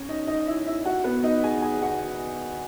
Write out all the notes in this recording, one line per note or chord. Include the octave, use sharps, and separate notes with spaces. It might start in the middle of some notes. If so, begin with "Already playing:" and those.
Already playing: C#4 C#5
D#4 D#5
D#4 D#5
E4 E5
E4 E5
F#4 F#5
B3 B4
D#4 D#5
G#4 G#5
G#4 G#5
F#4 F#5